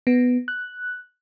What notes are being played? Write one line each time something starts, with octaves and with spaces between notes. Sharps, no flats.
B3
F#6